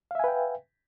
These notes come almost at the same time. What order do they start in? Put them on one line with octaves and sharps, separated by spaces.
F5 E5 G#5 B4 G5